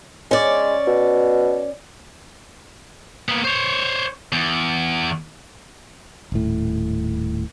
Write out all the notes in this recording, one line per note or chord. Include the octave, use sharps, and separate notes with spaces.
G#3 C#4 D5
B2
A#3 B3
C5 C#5
E2
D#1 A2